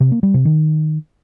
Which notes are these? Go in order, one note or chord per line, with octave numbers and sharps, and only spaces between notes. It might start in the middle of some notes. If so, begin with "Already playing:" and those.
C3
A#3
G3
C3
D#3